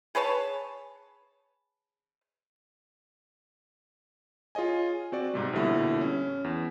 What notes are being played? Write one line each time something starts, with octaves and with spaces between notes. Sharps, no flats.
G#4 B4 C#5 A5
F4 G#4 C#5 D#5 G#5
C4 F#4 D5
G#2 C3 G3
A#1 B2 D3 G3 E4
C#4
E2